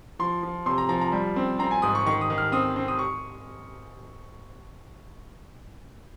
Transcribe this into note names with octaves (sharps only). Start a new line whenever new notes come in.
F3 C6
F3
C3 C6
A#5
F3 A#5
A#5
G3
C4
C4 A#5
G#5
G#2 D#6
C#6
D#3 C#6
D#6
D#3
F6
C4 D#6
C4
D#6
C#6